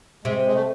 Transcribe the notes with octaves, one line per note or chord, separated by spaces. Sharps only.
C3 G#3
G#3
A3